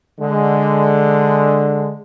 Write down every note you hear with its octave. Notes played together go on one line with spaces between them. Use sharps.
D3 G#3